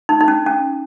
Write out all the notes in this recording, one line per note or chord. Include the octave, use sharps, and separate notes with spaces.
D#4
D#4
C#4
C#4